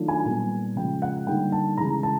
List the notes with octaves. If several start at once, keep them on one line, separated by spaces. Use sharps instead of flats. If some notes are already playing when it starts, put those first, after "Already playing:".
Already playing: D#3 F#3 A3 D4 F4
G#5
A#2 G3 B3
C#3 F3 G#3 G5
F#5
D3 G3 A#3 D#4 G5
A5
C#3 E3 G#3 A#5
A5